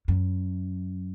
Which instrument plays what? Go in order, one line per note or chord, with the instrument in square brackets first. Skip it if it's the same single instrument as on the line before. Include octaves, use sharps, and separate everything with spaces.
[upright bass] F#2